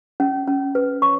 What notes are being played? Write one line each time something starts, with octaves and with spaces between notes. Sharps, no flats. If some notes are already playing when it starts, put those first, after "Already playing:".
C#4
C#4
B4
C#5 C#6